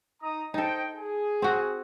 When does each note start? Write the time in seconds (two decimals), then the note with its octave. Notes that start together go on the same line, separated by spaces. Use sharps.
0.21 D#4 A#5 D#6
0.54 D#4 A4 C5 D#5 G5
0.97 G#4
1.42 C4 F#4